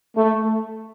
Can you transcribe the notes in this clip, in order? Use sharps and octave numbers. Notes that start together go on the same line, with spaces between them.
A3